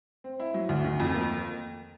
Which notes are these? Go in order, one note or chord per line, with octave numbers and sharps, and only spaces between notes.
C4
E4
F#3
D2
D#3
F2
A#3